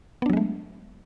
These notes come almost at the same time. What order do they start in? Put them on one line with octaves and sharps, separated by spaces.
B3 D4 F#3 G#3 A3